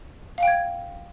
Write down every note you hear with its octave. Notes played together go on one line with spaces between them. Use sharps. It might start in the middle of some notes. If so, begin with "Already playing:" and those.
F5 G5 G#6